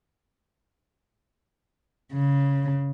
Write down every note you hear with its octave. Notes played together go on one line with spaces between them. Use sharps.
C#3